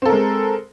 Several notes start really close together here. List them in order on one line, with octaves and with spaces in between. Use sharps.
C4 A4 A#4 G#3